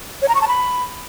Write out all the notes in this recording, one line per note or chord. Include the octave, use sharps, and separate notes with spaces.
C#5
A#5
C#6
A5
B5